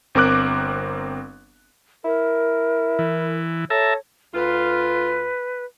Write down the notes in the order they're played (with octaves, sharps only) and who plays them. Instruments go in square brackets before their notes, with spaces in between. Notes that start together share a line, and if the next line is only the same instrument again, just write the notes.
[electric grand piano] G1 C4 A#4 D6 F#6
[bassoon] E4 [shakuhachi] A#4
[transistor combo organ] E3
[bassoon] A4 [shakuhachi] C#5 [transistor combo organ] E5 A5 A#5
[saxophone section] D2 F4 [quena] B4